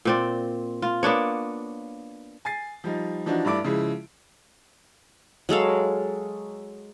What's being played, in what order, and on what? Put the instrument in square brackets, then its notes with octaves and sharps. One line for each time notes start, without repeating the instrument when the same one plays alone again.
[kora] A#2 C4 D5
F4
A#3 B3 D4 C#5
[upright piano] G#5 A6 C7
F3 G3 D#4
E3 F3 D4 D#4 F#4
G2 A3 E4 D5 D6 D7
C#3 F3 G#3 E4
[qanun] F#3 G#3 A4 F5